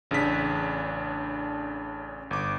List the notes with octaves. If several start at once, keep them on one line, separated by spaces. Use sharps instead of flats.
A1 C#3 D4 B6
G1 D6